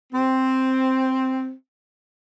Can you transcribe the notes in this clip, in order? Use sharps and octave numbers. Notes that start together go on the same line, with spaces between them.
C4